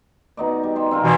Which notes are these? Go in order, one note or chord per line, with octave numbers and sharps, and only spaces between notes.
B2 D#4 D5
G3
C5 G5 G#5
C4 F4 A#4
B2 E3